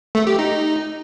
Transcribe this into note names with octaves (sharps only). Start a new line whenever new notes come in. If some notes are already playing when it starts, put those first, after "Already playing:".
A3
G4
D#4